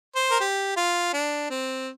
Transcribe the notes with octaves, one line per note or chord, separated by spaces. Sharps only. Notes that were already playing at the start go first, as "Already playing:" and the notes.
C5
A#4
G4
F4
D4
C4